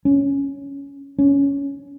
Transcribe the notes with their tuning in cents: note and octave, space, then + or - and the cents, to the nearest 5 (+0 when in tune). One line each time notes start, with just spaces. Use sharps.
C#4 +5
C#4 +15